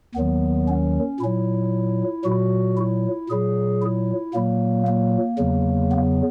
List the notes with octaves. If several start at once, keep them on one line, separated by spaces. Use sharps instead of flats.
D#2 D#3 F#3 B3
C#4
A#2 F#3 E4
A#2 F#3 F#4
E4
A#2 F#3 G#4
E4
A#2 F#3 A#3
A#3
E2 C#3 F#3
B3